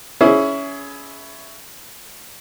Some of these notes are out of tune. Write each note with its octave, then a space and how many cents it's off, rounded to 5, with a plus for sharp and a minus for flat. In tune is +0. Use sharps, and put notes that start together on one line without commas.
C#4 +20 E4 +0 G#4 +20